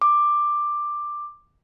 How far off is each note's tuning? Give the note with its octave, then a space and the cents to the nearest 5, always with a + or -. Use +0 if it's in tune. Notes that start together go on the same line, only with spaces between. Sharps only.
D6 +10